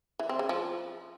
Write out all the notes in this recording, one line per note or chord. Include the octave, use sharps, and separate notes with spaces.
E3
C4
C#3
F3